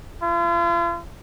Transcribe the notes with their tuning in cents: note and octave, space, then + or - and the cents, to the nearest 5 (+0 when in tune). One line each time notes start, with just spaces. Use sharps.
F4 -45